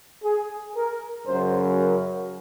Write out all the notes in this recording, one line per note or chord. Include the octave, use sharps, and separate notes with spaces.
G#4
A#4
F#2 C#3 F#3 C5
A#4